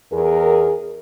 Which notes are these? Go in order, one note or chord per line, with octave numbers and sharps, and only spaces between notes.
E2 G#4 A#4